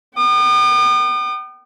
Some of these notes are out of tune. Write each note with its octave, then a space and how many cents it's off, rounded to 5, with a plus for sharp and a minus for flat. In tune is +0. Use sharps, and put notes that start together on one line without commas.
G5 -40 D#6 -45